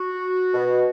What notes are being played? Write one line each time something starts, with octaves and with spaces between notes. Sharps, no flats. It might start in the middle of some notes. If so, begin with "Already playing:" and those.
Already playing: F#4
B2